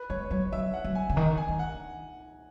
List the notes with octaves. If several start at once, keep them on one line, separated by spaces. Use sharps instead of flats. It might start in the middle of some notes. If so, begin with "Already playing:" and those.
Already playing: B4
G#3 C#5
F#3 C#5
F#3 E5
F#5
F#3
G#5
C#3
D#3 A#5
G#5
D#3
F#5